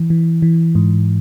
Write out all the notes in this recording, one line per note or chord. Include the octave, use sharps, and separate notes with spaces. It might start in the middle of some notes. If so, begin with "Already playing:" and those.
Already playing: E3
E3
E3
G#2